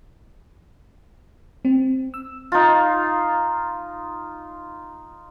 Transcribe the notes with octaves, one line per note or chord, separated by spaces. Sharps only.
C4
E6
D#4 F4